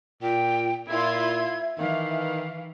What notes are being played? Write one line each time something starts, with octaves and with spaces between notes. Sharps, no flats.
A#2 F4 G5
A#2 E4 F4 E5 C6 G#6
D#3 E3 F5